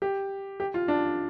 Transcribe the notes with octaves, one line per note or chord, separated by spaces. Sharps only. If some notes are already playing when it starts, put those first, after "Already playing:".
G4
G4
F4
D4